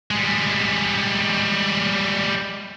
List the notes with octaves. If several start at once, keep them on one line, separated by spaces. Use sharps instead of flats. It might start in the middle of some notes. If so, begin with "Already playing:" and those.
G3 G#3